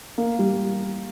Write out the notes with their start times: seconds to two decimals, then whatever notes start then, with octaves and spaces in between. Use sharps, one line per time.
0.18 A#3
0.39 G3